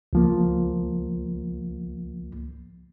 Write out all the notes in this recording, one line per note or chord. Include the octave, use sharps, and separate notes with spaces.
C#2 F3 A#3